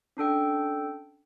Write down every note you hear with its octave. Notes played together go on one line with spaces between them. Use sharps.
C#4 D4 A4 G5